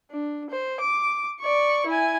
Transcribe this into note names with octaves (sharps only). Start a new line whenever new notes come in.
D4
C5
D6
D5 C#6
E4 G#5